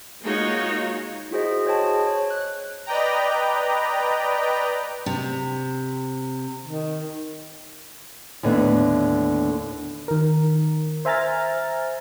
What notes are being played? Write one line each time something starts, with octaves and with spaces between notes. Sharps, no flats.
G#3 A#3 D#4 F4 F#4 C#5
E4 F#4 G#4 C5 D#5
G#4 C5 C#5 D#5 G5 A5
C#5
F#6
B4 D5 D#5 G5 A#5
C3
D#3
D#2 A2 D3 B3
D#3 A#4
C5 E5 G#5 A#5 F6 A6